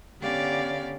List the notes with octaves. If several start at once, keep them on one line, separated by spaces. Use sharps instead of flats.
D3 B3 C#4 G4 D5 F5